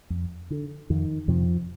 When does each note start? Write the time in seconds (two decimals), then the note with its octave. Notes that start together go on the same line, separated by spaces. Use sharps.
0.10 F2
0.50 D3
0.90 F2 D#3
1.28 F2 C3 F3